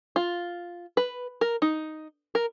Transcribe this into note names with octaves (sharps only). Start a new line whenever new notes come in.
F4
B4
A#4
D#4
A#4